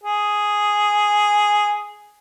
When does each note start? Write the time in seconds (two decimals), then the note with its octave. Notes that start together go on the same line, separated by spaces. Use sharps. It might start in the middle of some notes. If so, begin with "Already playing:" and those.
0.04 G#4